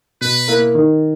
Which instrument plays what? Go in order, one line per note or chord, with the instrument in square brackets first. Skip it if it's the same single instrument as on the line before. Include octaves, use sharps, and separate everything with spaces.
[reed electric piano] B2 [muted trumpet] B4
[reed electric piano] A#3 E4 A#4
D#3